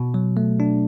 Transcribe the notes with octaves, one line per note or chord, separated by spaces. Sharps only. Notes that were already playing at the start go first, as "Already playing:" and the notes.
Already playing: B2
F#3
A3
D4